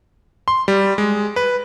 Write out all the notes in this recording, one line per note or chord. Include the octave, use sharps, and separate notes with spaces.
C6
G3
G#3
B4